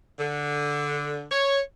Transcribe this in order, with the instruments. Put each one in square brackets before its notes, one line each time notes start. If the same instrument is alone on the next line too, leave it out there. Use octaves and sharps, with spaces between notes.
[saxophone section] D3
C#5